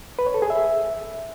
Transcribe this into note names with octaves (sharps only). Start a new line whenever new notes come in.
B4
C#5
A4
G#4
E5